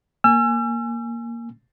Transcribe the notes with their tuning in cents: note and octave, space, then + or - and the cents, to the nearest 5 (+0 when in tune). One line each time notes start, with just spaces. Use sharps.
A#3 +0 G#5 +0 E6 +40